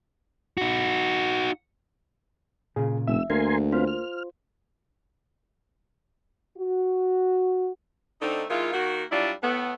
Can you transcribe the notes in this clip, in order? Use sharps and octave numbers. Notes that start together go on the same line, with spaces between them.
D#4 F#4
A#2 C#3 G#4
F1 E5 E6
D2 A#3 A#4 G#5 C6
C4 F4 B4 C5 F5
F6
F#4
D3 A3 C4 D#4
D#3 G#3 E4 F4
D#3 A#3 F#4
F#3 G3 D4 E4 F4
A2 A3 B3